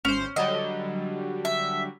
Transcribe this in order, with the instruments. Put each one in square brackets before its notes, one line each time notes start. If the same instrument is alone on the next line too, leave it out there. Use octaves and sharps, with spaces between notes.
[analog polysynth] G#1 C5 [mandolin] C#4
[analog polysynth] D3 F#3 G3 [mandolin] D#5
[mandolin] E5